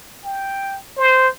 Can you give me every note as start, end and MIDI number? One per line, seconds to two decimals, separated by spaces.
0.24 0.77 79
0.97 1.27 72